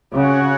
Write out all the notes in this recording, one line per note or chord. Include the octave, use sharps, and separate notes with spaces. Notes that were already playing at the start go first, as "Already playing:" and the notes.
C#3 C#4 F#4 C#5 F#5